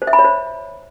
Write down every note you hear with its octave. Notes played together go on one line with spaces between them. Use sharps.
C5
E5
B5
C#5
C5